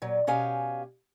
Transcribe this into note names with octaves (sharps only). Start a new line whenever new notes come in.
A#2 F#3
B2 C#4 G4 F5 G#5